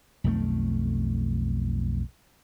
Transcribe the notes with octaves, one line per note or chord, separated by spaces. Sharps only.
B1 F2 D#3 A3